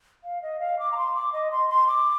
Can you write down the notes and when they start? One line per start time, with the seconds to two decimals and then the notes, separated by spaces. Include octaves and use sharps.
0.24 F5
0.42 D#5
0.60 F5
0.79 D6
0.92 A#5
0.97 C6
1.15 D6
1.33 D#5
1.51 C6
1.69 C6
1.87 D6